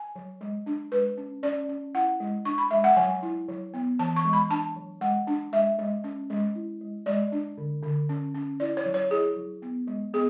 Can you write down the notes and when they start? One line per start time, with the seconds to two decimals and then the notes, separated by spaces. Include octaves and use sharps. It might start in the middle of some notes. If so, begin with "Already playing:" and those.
Already playing: G#5
0.16 F#3
0.41 G#3
0.66 D4
0.92 G#3 B4
1.18 C#4
1.43 C#4 D5
1.69 C#4
1.95 E4 F#5
2.20 G#3
2.45 D4 C#6
2.58 B5
2.71 G#3 E5
2.84 F#5
2.97 F#3 G#5
3.23 E4
3.48 F#3
3.74 B3
3.99 E3 A5
4.16 C#6
4.25 G#3
4.33 B5
4.50 D4 A5
4.76 F#3
5.01 G#3 F#5
5.27 D4
5.53 G#3 E5
5.79 G#3
6.04 C#4
6.30 G#3
6.55 E4
6.81 G#3
7.06 G#3 D5
7.32 D4
7.58 D3
7.83 D3
8.09 C#4
8.35 C#4
8.60 E4 D5
8.77 C#5
8.86 F#3
8.94 C#5
9.11 E4 G#4
9.36 F#3
9.62 B3
9.87 G#3
10.14 B3 G#4